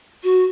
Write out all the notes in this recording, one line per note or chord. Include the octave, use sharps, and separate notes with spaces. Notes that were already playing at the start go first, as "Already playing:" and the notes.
F#4